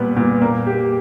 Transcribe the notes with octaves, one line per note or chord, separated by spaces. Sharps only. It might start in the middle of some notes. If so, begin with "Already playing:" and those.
Already playing: A#2 G3 B3
A#2
A#3
G4